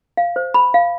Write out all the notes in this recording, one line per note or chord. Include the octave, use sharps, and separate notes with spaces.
F5
C5
B5
F5